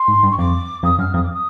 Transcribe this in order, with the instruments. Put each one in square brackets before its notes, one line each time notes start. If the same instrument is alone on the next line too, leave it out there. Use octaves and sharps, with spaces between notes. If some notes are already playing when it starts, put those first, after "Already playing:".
Already playing: [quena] C6
[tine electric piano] G#2
G2
[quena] C#6
[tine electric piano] F2 [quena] D6
[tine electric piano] F2 [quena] D#6
[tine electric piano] F#2 [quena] F6
[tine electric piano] F2 [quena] D#6
[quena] D6
D#6